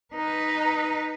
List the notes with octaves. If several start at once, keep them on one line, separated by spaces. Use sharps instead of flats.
D#4 B4